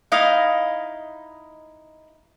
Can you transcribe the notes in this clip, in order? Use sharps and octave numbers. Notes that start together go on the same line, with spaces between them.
D#4 E4 D#5 F5